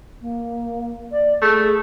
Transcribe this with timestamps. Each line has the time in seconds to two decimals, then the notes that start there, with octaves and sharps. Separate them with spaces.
0.21 A#3
1.11 D5
1.42 A3 G#4